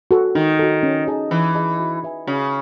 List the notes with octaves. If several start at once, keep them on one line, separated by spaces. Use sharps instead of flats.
F#4 A4
D#3 D#4
F#4 A4
C#4
G#4 D#5 A5
E3 C#4
G#4 D#5 A5
F#4
B4 E5 G#5
C#3 F#4